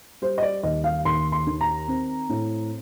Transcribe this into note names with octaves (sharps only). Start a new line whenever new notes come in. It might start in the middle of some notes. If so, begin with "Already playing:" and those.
G3 C5
D#5
D5
D#2 D#5
F5
D#2 C6
C6
D#3
A#5
C4
A2